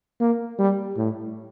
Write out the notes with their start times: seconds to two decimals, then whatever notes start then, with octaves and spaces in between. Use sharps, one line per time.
0.20 A#3
0.59 G3
0.97 A2